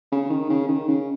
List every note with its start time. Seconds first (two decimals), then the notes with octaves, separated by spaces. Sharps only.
0.12 C#3
0.30 D#3
0.49 C#3
0.68 D#3
0.88 C#3